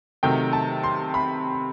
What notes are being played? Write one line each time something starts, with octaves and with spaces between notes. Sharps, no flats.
C3 D#3 F#3 A3 G5
A5
C6
B5